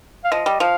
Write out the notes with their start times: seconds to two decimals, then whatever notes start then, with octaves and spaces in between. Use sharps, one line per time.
0.24 F5
0.32 F3 D#5
0.46 G3
0.60 F3 F5